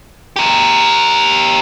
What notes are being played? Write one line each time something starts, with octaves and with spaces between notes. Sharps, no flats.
G4 A#4